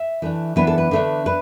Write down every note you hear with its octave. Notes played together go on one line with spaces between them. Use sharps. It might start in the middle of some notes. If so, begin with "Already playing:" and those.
Already playing: E5
E3 A3 D4
E3 B3 D4 B4
A4
B4
D3 A3 D4
D4 B4